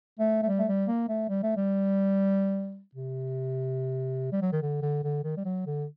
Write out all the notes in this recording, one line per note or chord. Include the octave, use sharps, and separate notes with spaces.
A3
A3
G3
A3
G3
A#3
A3
G3
A3
G3
C3
G3
F#3
D#3
D3
D3
D3
D#3
G3
F#3
D3